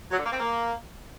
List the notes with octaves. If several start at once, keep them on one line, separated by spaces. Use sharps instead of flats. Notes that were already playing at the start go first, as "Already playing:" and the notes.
F#3
D3
A#3
C4
A#3